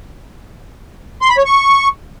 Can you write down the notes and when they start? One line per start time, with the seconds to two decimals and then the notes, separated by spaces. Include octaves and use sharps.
1.22 C6
1.30 B5
1.38 C#5
1.45 C#6